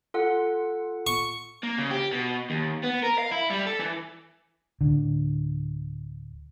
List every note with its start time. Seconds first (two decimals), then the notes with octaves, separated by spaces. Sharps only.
0.14 F4 A4 F#5
1.07 C#6
1.63 A#3
1.78 C#3
1.91 G4
2.12 B2
2.50 D#2
2.83 B3
3.03 A#4
3.18 F5
3.32 E4
3.50 G3
3.67 A4
3.80 E3
4.81 D1 D3